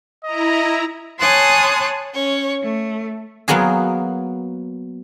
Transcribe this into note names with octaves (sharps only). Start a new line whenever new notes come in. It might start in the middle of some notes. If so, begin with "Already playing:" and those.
E4 D#5 A#5
C#5 G#5 A5 C6 D#6 F#6
C#4 C#5
A3
F#3 A#3 B3 F#4 G#4